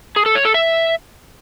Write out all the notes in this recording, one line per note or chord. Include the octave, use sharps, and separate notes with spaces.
G#4
A4
C#5
A4
E5